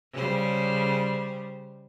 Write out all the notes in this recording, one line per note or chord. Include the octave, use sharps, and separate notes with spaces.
C#3 G3 C5